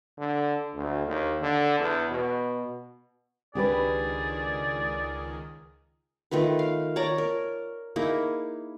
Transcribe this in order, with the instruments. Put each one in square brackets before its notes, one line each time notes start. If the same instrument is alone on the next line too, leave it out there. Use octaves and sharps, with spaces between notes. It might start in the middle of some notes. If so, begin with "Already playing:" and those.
[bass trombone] D3
D2
D#2
D3
E2
B2
[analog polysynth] C#2 D#3 [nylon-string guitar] D4 G4 B4 [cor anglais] G#4 [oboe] D5
[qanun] D#3 A3 F4 B4
F5
C#5 D5 A5 A#5
A#4
A#3 D#4 E4 G#4